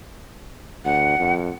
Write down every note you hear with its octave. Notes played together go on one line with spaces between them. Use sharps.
D2 F#5
F2